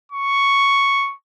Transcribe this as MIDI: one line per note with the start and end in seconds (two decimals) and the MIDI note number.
0.12 1.14 85